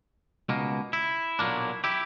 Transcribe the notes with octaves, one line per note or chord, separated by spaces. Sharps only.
C#2 B2 A#3
E4
B1 A#2 F#3 A#3 D4
E4 G4